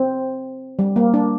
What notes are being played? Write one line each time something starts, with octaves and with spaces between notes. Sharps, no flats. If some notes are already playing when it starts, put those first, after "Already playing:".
Already playing: C4
G3
A#3
D4